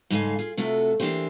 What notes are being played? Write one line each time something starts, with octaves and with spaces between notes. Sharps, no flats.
G#2 C#3 G#3 A4 F5 G#5
F4 G#4
C3 A3 F4 F#4 A4
E3 A#3 D4 G4 C5